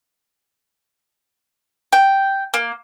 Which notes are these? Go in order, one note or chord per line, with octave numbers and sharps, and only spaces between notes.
G5
A#3